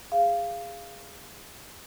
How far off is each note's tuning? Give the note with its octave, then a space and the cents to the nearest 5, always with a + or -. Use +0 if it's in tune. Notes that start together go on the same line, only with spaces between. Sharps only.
G#4 -20 F5 -15